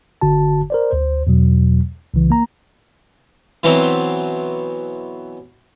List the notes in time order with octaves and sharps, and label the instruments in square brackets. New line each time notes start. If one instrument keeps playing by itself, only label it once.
[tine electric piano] G1 D3 F#4 A5
A#4 C5 D5
D2 C5
E2 B2 F#3
C2 C#3 E3
A#3 A#5
[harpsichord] B2 E3 F#3 B3 C4